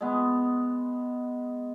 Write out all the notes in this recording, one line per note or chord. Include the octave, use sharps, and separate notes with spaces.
G#3 B3